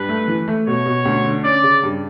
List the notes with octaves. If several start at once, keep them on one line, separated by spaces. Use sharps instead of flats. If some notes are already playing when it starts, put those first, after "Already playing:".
Already playing: G2 B4
A3
E3
A3
B2 C#5
B2
D2
D3
C#4 D5
C#3
G2